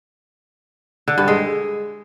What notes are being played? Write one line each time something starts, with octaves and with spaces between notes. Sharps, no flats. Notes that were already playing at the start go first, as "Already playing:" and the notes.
D3
G2
G#3